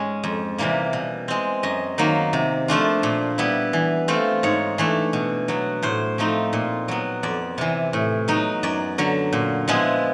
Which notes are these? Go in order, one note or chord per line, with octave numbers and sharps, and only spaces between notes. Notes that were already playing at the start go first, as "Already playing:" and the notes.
Already playing: G#2 G#3 C#4
F2
C3 E3 G3 A#3
B2
G#3 C4
F#2 D#5
D#3 F#3 A#3
C3
F3 A3 D4 F4
A#2
G3 B3 E4
E3
A3 C4 F4
G#2 C#5
E3 A3 D4
B2
F#3 B3
A2 C5
F3 A3 C4 D#4
A#2
F#3 B3
F2 D5
C3 E3
A2
F#3 B3 D#4
F#2 D5
D3 F#3
A#2
F3 G#3 B3 E4